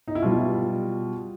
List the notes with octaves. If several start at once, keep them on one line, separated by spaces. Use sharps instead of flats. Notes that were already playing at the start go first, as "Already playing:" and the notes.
D#4
E4
B2 G3 F4